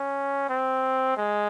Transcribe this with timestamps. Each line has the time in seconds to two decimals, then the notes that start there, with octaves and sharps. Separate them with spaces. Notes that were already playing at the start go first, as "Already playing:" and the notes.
Already playing: C#4
0.49 C4
1.17 G#3